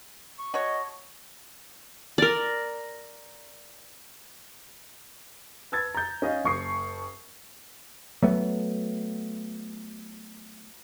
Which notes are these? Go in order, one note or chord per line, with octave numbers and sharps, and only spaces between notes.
C#6
F#4 C#5 D#5 A5 C#6
A#4 D5
B4 A5 E6 G#6 A6
A#5 G6
C#4 D#5 F5
F#1 C#6 D#6 C7
F#3 A3 B3